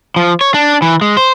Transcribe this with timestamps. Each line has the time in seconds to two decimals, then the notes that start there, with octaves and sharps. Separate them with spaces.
0.16 F3
0.41 C#5
0.54 D4
0.82 E3
1.01 G#3
1.17 C5